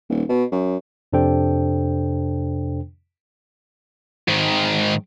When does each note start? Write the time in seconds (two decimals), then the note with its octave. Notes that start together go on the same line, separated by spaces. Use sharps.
0.09 D#1
0.29 B2
0.52 F#2
1.13 F2 C3 D4 A4 C5 G5
4.28 G#2 D#3